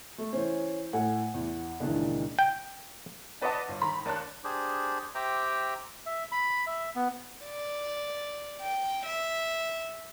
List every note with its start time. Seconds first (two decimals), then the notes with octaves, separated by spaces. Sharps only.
0.18 A3
0.33 E3 C#4 C5
0.93 A2 F#5 G#5
1.34 E2
1.80 C#2 A#2 D#3 E3 D4
2.39 G5
3.41 D4 B4 D5 D#5 F#5 A5
3.68 G1
3.82 D#3 A#5 B5
4.05 D#2 D4 A5 F#6
4.44 D4 G4 G#4 C5
5.15 G4 C5 E5 G5 A#5 D6
6.06 E5
6.32 B5
6.67 E5
6.96 B3
7.45 D5
8.61 G5
9.05 E5